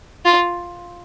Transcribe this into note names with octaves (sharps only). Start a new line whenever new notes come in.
F4